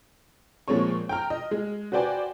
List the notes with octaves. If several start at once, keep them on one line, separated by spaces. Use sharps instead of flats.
A#2 F3 G#3 C4 C#5 C#6
G5 A#5 F6
D#5
G#3
F#4 B4 C5 D5 G5 G#5